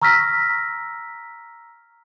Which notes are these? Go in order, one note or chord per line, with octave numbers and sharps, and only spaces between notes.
A#5 C#6 E6 F6 A#6 B6